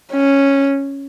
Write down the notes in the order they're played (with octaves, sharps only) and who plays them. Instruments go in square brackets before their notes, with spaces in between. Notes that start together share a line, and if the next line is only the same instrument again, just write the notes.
[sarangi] C#4